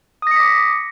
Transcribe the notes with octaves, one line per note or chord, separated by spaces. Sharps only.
D6 D#6 A#6 B6 C#7